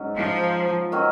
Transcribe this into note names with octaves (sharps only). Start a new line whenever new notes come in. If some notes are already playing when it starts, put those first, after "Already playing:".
Already playing: G#2 F#3 C#4
F3
D#3 F#3 C#4